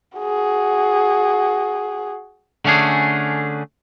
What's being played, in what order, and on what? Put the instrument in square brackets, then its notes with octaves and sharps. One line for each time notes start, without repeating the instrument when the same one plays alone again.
[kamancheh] F#4 G#4
[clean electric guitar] D3 A3 C#4 D4 G#4